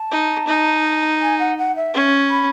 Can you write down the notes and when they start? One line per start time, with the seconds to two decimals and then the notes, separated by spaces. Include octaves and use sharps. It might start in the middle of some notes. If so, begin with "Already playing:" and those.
Already playing: A5
0.12 D#4
0.48 D#4
1.22 G#5
1.39 F#5
1.58 F#5
1.76 E5
1.94 C#4
2.30 B5